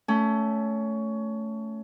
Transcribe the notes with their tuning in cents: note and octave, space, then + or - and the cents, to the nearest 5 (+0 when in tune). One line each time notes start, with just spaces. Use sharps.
A3 +0 C#4 +20